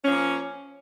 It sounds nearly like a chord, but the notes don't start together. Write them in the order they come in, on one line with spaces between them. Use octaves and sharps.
C#4 F3 A#3